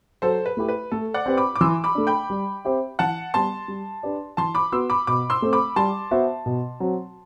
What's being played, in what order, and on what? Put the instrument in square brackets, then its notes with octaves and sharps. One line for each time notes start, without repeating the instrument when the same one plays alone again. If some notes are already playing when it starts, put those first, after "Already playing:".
[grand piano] F#3 [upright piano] A4 C5
[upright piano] B4
[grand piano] A3 E4 G4
[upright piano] B4
[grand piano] A3 [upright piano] A4
[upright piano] D5 F#5
[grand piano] C4 G4 B4
[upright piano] B5 D6
D6
[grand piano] E3 [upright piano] C6 E6
[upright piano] B5 D6
[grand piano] A3 D4
[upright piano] G5 B5
[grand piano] G3
C4 G4 C5 E5
[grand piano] E3 [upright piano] F#5 A5
[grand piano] G3 B3 [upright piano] A5 C6
[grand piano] G3
D4 G4 B4 D5
[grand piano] E3 [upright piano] A5 C6
[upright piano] B5 D6
[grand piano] B3 F#4 B4 [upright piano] C6 E6
[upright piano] B5 D6
[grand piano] B2 [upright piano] B5 D6
[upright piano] C6 E6
[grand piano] A3 C4
[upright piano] B5 D6
[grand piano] G3 [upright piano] A5 C6
[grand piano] B3 F#4 C5 E5
B2
F#3 C4